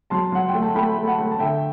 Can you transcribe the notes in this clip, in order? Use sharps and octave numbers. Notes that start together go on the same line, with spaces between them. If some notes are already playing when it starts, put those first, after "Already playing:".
F#3 A5 C6
F#3 F#5
G5
A3
A5
A3 G5 B5
A3
F#5 A5
A3
A5
D3 E5 G5